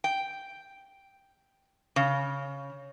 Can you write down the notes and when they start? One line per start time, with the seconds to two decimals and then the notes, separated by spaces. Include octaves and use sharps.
0.04 G5
1.96 C#3